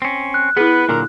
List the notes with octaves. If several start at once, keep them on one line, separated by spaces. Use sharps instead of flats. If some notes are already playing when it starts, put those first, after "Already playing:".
C4 C#4
F#6
B3 E4 G#4 B4
A#2 D3 F#3 A#4